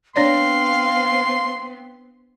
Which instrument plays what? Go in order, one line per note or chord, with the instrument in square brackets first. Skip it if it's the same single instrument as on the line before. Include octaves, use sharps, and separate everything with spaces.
[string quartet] B3 C4 [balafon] D4 C#5 D5 [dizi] F5 [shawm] C6